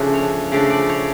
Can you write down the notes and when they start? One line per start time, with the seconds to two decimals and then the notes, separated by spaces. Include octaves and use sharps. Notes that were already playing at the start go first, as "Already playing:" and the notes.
Already playing: C#3 F3 A3 D4
0.14 C#5
0.52 C#3 F3 A3 D4 D5
0.70 D5
0.89 C#5